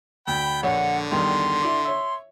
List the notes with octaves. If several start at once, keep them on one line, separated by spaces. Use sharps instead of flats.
D2 G5 B5
A#1 D3 C#5 F#5
E2 G2 D#3 C6
E4 D5
C#5 E5